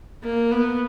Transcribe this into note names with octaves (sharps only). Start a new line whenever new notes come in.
A#3
B3